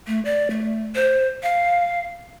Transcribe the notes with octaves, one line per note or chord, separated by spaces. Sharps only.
A3
D5
A3
C5
F5